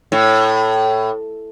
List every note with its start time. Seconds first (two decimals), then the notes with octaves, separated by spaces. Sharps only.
0.12 A2